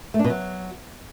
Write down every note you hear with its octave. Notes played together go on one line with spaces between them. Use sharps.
A3
D4
B2
F#3